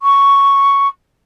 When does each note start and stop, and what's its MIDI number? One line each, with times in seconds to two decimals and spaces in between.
0.01 0.88 85